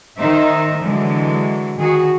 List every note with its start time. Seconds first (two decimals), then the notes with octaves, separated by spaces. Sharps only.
0.17 D#3 D#4 C5 E5
0.84 D3 E3 F#3 G#3
1.78 D#3 F#4 G#4